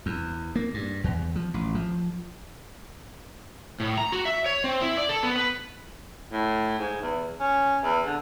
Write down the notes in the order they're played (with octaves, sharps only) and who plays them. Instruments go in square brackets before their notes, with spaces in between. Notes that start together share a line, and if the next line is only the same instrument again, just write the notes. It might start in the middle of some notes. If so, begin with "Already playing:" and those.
[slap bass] E2
A#3
G2
E2
F3
A1
F3
[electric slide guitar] A2
A#5
F#4
E5
C#5
C4
E4
D5
A4
B3
B4
[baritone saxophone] A2
G#2
E2
C#4
E2
D3